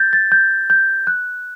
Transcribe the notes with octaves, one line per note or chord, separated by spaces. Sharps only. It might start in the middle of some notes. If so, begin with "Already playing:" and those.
Already playing: G6 A6
A6
G6
G6
F#6